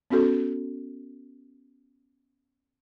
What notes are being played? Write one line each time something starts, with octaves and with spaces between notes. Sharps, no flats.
B3 C#4 F#4 A4